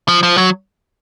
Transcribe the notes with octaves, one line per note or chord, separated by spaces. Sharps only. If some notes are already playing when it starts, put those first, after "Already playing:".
F3
F3
F#3